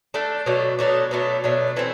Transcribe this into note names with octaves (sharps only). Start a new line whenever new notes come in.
A3 D4 A4
B2 F#3 A3 D4
B2 F#3 A3 D4
B2 F#3 A3 D4
B2 F#3 A3 D4
E3 A3 C4